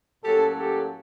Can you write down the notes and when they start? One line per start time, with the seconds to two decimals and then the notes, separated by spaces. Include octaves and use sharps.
0.23 A2 F#3 A#3 C#4 G4 A4
0.57 G4 A4